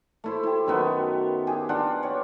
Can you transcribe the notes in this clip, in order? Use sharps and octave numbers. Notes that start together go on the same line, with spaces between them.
A3 E4 C5
E4 G4
F#2 D#3 B3 F#4
G4 G#4
D4 F4 F#5
G4 C#5